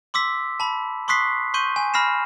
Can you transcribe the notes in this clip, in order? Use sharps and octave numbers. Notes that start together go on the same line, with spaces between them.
C6 D6 E6 B6
A5 B5
C6 C#6 D#6 F#6 B6 C7
C6 C#6 G6 D#7
G#5
B5 F6 A#6 C7 E7